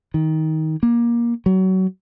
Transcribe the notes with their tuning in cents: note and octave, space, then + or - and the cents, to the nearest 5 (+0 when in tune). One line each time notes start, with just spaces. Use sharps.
D#3 +20
A#3 +20
F#3 +25